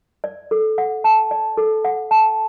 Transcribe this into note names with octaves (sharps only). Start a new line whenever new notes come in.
D5
A4
F#5
A5
D5
A4
F#5
A5